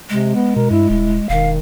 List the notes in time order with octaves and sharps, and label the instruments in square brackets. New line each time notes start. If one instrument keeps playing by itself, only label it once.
[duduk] C3 [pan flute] G#3
[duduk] B3
[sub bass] B2 [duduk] A#4
[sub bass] G2 [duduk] E4
[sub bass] D#1 [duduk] E4
[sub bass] E1 [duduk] D#3 [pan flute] F5